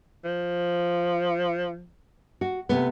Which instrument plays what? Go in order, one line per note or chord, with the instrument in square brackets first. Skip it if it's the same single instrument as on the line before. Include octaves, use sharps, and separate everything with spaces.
[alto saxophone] F3
[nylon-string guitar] F#4
C3 A3 B3